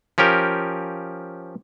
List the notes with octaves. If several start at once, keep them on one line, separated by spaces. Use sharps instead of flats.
F3 C#4 G4 A#4